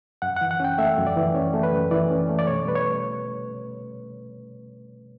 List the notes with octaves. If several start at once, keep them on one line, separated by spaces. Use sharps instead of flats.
F#2 F#5
E3 F#5
F#5
C#4 G5
A3 E5
F#2
D5
E3
C#4 C#5
A3
B4
F#2
E3 D5
C#4
A3
D5
B2 C#5
G3 B4
C#5